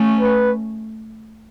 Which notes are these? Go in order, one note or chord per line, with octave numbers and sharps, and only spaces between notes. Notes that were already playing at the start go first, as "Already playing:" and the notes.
Already playing: A3 C#4
B4